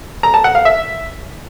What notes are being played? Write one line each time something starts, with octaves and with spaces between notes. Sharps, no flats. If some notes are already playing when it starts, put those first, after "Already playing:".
A#5
A5
F#5
F5
E5